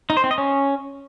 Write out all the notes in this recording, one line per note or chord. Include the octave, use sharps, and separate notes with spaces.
D#4
C5
C4
D#5
C#4